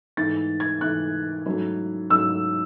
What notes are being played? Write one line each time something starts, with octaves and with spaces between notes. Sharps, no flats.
G#2 E3 A3 A6
G#6
G#2 E3 A3 F#6
G#2 F#3 A3 C#4 E4
G#2 F#3 A3 C#4 E4 E6